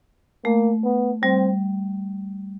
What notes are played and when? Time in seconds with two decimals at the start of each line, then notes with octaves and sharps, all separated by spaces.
0.44 A3 A#3
0.84 B3
1.23 G3 C4